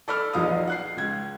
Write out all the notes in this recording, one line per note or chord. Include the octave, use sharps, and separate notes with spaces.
A4 D5 B5 E6 F6
A#1 E2 F3 D#4 F5 D#6
F#5 F#6 C7
C#2 G#6